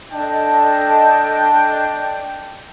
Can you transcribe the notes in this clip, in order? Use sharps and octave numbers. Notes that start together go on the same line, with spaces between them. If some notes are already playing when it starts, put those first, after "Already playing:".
D4 A4 D#5 G5 A5